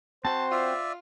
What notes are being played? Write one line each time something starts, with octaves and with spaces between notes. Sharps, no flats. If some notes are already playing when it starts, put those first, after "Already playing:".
C4 F#4 C5 A5
F4 D5 E5